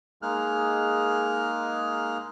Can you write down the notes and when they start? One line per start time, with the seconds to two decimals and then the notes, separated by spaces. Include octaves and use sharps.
0.22 G#3 A#3 D#4 G#4 F6 F#6